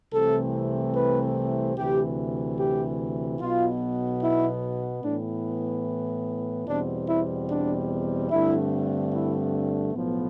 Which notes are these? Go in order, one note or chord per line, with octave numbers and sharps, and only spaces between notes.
C2 C3 E3 A3 C4 A4
B4
D2 C3 E3 G4
G4
B1 B2 B3 F4
E4
A2 E3 B3 D4
E2 B2 G3 C4 D4
E4
D4
G2 D3 A3 C4 E4
E4
B1 A2 F3 B3